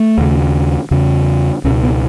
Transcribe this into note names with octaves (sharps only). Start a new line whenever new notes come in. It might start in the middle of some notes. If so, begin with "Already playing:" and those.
Already playing: A3
D#2 C#3
E2 C#3
C#2 B2 C#4
B3